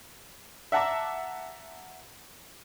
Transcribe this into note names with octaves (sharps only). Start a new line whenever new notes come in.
E5 F#5 A5 A#5 D6